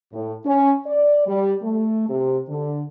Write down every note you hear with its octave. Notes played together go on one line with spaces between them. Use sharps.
A2
C#4
D5
G3
A3
C3
D3